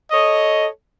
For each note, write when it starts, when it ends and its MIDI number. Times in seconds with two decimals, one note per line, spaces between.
0.11 0.66 69
0.11 0.66 73
0.11 0.66 75